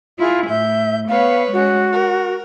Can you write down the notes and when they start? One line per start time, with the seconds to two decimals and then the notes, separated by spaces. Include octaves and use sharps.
0.18 E4 F4 G#4
0.49 A2 E5 G6
1.09 B3 B4 C#5 F5
1.53 G#3 C#4 F#4
1.92 A#4